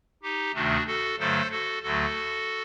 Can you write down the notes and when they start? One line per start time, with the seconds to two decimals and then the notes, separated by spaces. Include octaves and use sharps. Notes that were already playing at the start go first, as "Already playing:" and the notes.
0.23 D#4 G4
0.54 D2 C3 D#3 A3 D4 F#4
0.87 F#4 A4
1.19 G2 D3 F#3 A3 A4 C5
1.51 F#4 A4
1.83 D2 D3 F#3 A3 F#4 A4